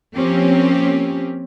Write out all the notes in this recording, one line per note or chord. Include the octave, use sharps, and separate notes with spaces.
F3 A#3 C4 C#4 G4